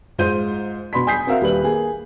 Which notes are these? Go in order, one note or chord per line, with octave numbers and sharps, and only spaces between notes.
G#2 G#3 F4 C5 G6 D#7
B2 B5 C6 B6
G#5 D#6 G6 B6 C7
C4 F#4 A#4 E5 F5
D#1 G3 B4 F#7
A#3 G#4